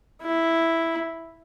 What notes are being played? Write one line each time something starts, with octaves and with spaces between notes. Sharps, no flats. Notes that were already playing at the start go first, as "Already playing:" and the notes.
E4